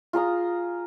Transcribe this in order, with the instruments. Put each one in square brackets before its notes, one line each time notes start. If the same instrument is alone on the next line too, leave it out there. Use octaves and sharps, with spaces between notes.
[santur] F4 G#4 A#5 D#6